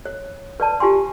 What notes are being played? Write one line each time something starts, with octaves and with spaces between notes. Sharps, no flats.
C#5
B4 D5 A5
F4 G4 G#5 C6